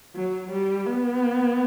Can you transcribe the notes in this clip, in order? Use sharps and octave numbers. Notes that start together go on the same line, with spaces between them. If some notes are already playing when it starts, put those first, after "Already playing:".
F#3
G3
B3